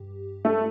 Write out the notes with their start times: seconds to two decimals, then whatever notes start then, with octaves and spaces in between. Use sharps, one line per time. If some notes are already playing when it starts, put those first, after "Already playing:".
Already playing: G2 G4
0.45 A3